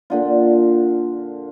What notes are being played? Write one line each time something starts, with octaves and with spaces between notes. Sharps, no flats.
A#2 D3 F4